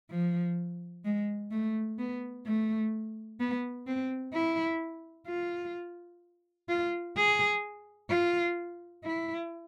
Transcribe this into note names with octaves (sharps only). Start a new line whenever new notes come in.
F3
G#3
A3
B3
A3
B3
C4
E4
F4
F4
G#4
F4
E4